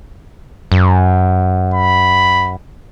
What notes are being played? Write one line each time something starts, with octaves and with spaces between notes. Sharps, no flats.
F#2
B5